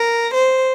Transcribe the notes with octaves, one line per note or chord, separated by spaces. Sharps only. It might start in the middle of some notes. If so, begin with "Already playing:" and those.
Already playing: A#4
C5